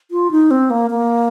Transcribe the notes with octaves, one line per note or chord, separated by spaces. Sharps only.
F4
D#4
C4
A#3
A#3